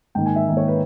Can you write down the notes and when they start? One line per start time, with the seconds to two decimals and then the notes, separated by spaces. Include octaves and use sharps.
0.15 G#2 D#3 A#3 G5
0.26 G#5
0.36 E5
0.47 G#2 D#3 A#3
0.57 C#5
0.68 B4